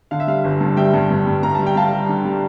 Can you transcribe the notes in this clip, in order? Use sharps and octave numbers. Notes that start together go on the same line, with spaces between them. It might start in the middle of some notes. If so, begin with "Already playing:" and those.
D3 F5
E5
G3 F5
G1
G2
G3 E5 G5
G2
G2
G2
G2 A#5
G3 A5
G5
G3 F5 A5
G3
D3
G3